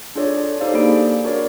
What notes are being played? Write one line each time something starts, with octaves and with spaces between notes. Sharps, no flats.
D4 F4 G#4 A4 C#5 D5
D#4 G4 A4 C5 D5 F5
A#3 D4 G#4 D5 B5 D7
D4 F#4 A#4 C#5 D5